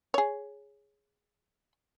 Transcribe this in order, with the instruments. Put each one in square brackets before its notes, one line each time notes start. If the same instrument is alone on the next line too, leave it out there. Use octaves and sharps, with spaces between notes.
[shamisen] G#4 C#5